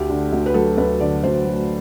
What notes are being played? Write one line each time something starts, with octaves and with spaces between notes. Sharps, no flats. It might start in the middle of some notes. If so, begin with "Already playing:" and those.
Already playing: D2 G4
D3
D2
B4
F#3 A4
D2 B4
D3 D5
D2 C5
F#3